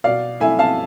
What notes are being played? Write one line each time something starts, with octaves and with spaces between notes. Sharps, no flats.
B2 D5 F5
A3 E4 E5 G#5
F5 A5